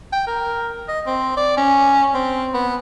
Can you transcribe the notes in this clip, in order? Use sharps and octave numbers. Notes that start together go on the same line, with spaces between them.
G5
A#4
D#5
C4
D5
C#4
C4
B3